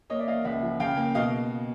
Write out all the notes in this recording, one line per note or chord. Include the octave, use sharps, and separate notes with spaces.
A#3 C#5 D#5
D5 E5
A#3 D#5 F5
C#2 E5 F#5
F3
C#3 F5 G5
A#3
B2 D#5 F5